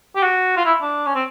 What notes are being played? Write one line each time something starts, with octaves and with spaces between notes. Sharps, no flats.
G4
F#4
F4
E4
D4
C#4
C4